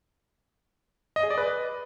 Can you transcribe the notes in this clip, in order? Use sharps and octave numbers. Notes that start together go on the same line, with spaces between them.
D#5
G#4
D5
B4